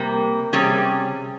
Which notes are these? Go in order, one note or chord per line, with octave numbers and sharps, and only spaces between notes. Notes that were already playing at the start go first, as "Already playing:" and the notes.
Already playing: C3 G3 A#3
C3 G3 C#4 G#4